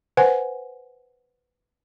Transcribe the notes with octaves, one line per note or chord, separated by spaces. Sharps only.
B4 C5 F#5 G#5